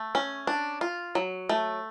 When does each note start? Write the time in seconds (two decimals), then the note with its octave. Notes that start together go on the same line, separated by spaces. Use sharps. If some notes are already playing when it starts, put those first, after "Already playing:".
Already playing: A3
0.15 C#4
0.47 D4
0.81 F4
1.15 F#3
1.49 A3